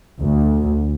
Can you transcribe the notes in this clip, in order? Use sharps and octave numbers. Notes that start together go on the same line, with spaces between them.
D2